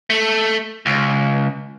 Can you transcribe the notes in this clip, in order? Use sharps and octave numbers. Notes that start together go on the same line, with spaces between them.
A3
C#2